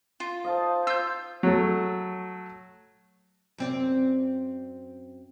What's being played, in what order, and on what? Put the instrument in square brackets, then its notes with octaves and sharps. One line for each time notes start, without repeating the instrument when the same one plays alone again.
[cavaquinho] F4
[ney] C5 [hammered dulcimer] D#5 F5 A5
[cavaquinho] F4 [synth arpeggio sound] E6 G6
[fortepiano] F#3 A3
[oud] F#2 C4 D5